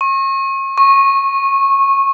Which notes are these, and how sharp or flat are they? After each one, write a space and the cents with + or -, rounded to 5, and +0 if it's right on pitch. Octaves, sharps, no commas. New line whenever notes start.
C#6 -40
C#6 -20